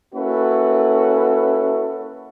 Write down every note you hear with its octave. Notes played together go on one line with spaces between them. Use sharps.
A#3 C#4 E4 F#4 A4 B4